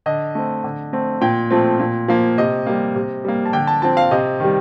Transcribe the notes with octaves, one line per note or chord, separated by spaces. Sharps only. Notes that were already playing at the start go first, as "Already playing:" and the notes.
D3 D#5
A3 C4
D3
A3 C4
A#2 G5
F3 A3 C4
A#2
F3 A#3
C3 D#5
G3 A#3
C3
G3 A#3
A5
D3 G5
A5
F3 C4 A5
F5
C3 D#5
D#3 G3